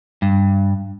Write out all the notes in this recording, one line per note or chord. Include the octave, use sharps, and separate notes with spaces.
G2